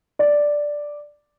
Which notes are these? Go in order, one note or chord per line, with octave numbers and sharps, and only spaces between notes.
D5